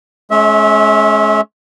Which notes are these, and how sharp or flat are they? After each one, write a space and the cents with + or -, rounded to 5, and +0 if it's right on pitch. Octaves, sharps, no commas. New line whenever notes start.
G#3 +40 C#4 +0 E5 -25